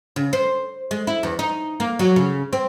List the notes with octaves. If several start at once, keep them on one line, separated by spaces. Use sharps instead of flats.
C#3
C5
G#3
E4
E2
D#4
A#3
F#3
C#3
C4